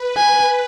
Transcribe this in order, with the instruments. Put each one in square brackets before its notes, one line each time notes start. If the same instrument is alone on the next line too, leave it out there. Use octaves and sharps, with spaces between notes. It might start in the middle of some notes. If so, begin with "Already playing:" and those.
Already playing: [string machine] B4
[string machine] B4 [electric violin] G#5